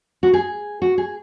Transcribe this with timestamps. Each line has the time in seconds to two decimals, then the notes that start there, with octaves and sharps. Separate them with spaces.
0.23 F#4
0.34 G#4
0.82 F#4
0.98 G#4